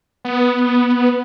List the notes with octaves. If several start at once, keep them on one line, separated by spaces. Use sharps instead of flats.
B3